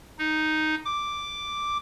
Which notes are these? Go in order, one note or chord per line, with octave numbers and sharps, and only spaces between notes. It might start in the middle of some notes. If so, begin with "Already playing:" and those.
D#4
D6